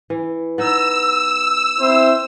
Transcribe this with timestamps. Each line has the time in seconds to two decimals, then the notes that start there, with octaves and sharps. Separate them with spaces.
0.10 E3
0.58 B3 D#4 E6
1.80 C4 E4 C5